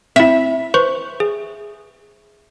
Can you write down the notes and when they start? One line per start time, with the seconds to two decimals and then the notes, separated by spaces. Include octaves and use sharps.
0.16 C4 E4 E5
0.74 B4 C5 C#6
1.20 G#4